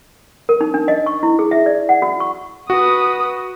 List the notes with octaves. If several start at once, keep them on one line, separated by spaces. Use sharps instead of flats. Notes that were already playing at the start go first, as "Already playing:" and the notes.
A#4
D#4
D4
D#5
C#6
E4
G#4
E5
D5
F#5
F#4
C#6
F#4 B4 D#6